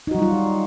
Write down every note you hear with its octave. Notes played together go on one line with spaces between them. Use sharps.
F#3 G3 D#4 F4 F#4